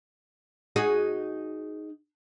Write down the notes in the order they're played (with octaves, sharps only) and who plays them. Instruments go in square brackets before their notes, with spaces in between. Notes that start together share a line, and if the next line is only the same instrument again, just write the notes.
[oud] D#4 F#4 G#4